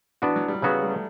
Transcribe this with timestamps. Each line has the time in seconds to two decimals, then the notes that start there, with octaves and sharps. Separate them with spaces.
0.22 E3 B3 D4 F#4
0.36 F#3
0.48 G3
0.62 C#3 F#3 B3 F#4
0.82 G3
0.90 A3